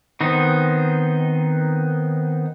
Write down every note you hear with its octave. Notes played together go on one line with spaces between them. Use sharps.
D#3 B3 C4 D#4